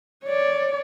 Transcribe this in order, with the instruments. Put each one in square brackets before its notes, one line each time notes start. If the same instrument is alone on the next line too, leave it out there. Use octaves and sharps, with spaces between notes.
[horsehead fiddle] C#5 D5